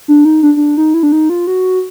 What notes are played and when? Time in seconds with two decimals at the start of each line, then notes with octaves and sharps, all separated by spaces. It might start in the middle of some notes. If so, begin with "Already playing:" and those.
0.08 D4
0.25 D#4
0.43 D4
0.56 D4
0.77 D#4
0.94 E4
1.03 D4
1.12 D#4
1.30 F4
1.47 F#4